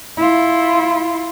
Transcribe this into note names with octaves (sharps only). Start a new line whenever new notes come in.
E4 F4